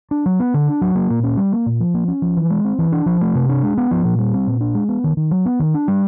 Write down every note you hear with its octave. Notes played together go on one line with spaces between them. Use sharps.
D4
F#3
B3
D3
D4
F#3
A#3
A#2
C#4
G3
A#3
A#2
F3
A#3
C#4
F3
E3
G#3
C4
E3
D4
F3
A3
C3
D4
G#3
B3
F3
A#2
G3
C4
A#2
D4
G#3
B3
D#3
D#3
F#3
B3
D#3
D4
G3